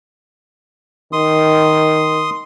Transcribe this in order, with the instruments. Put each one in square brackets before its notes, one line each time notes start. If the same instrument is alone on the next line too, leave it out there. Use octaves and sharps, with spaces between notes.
[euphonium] D#3 [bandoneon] C6 D#6